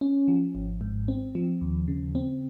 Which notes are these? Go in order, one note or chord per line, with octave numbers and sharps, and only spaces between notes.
C#4
F3
G#1
G#2
C4
F3
D#2
C#3
C4